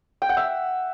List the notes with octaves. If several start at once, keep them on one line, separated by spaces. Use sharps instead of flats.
G5
F#5
E5